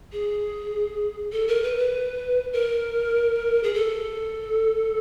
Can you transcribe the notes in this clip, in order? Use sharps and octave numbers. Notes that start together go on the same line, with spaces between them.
G#4
A4
A#4
B4
B4
A#4
G#4
A4